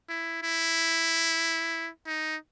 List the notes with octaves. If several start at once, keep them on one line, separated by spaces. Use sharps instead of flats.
E4
E4
D#4